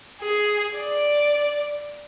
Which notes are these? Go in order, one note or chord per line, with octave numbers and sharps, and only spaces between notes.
G#4
D5